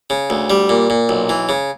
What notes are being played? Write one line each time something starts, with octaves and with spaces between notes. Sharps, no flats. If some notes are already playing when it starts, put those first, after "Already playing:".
C#3
D2
G3
A#2
A#2
B1
E3
C#3